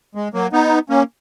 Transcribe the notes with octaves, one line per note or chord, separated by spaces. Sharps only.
G#3
F#3 A#3
B3 D#4
A#3 C#4